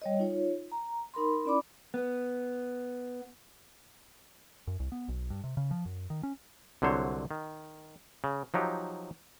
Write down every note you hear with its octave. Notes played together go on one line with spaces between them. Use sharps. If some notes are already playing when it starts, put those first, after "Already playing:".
G3 C#5 D#5
D#4 F4 C#5
A#5
D#4 A#4 B5 C6
C#4 E4 D5 B5 D6
B3
F#2
C2
B3
B1
G2
C3
C#3
F3
F#2
D#3
C#4
C2 D3 F#3 C5 C#5
D#3
C#3
F3 F#3 D#4 G4